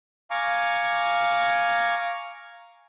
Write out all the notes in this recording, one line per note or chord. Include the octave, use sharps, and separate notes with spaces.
F5 G#5 A#5 C#6 D6